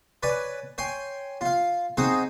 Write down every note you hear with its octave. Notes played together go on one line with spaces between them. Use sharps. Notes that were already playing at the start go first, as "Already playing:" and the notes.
B4 C#5 D5 G#5
C#5 G5 G#5 C6
F4 F5
C4 D#4 F#4 G#4 C5